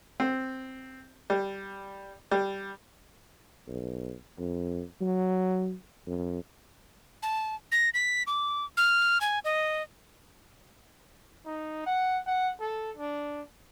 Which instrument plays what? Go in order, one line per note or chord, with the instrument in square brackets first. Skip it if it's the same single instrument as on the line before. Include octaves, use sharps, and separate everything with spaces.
[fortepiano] C4
G3
G3
[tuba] B1
F2
F#3
F2
[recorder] A5
A#6
B6
D6
F6
G#5
D#5
[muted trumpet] D#4
F#5
F#5
A4
D4